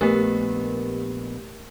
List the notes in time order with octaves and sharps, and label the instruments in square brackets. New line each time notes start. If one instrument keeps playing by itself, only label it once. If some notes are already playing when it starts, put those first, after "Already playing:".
[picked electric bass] A#1 B3 [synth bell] A3 G4 A#4